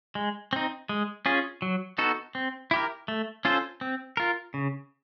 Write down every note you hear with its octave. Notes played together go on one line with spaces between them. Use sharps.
G#3
C4 D#4
G#3
C#4 F4 G#4
F#3
B3 D#4 F#4 A4
C4
E4 G4 A#4
A3
C#4 F4 A4 C5
C4
F4 A#4
C#3